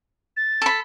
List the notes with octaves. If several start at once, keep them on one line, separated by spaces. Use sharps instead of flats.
A6
A4 B5